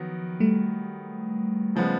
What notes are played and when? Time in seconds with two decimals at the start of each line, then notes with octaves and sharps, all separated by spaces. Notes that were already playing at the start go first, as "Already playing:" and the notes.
Already playing: D#3 F3 F#3 B3
0.40 G3 A3
1.76 C#3 F3 G#3 B3